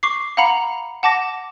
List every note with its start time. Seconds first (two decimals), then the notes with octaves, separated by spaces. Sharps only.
0.03 C#6 D6 C7
0.37 F5 F#5 A#5 B5 C#7 F7
1.03 F#5 A5 D6 A#6